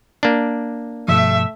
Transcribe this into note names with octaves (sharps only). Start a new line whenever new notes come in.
A#3 D4
G2 B2 F3 A3 E5